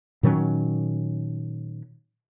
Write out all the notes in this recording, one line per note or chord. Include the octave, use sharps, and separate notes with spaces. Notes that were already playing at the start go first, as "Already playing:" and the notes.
A#2 D#3 F#3 C#4